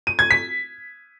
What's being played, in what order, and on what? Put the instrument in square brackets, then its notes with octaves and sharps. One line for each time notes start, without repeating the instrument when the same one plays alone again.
[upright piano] D#7
G#6
B6